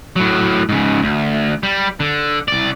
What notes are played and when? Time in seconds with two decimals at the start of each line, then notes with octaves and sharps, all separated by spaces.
0.16 A2 F#3
0.69 G#2 C#3
1.02 D2
1.63 G3
2.00 D3
2.48 C2 D5